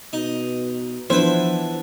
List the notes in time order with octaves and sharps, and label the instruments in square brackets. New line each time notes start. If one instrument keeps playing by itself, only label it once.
[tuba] B2 [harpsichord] D#4
[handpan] E3 B3 D4 [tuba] F3 [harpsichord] E4 B4 [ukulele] C5